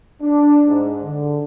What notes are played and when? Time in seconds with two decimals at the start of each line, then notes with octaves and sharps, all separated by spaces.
0.22 D4
0.66 G#2
1.03 D3